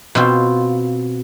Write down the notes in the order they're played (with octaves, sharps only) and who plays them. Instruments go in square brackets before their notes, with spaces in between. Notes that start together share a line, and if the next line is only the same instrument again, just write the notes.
[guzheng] B2 C4 F4